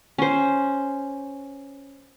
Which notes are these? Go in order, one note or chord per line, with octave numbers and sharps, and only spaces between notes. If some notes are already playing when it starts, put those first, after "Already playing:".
C#4 C5